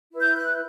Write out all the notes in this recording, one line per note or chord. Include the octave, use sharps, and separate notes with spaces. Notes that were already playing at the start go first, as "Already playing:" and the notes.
E4 B4
G6
F#6